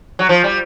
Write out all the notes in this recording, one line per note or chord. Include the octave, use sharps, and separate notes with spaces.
F#3
F3
G3